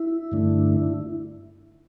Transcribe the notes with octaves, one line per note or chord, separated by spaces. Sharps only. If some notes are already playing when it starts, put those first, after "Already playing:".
Already playing: E4
G2 D3 A3 D4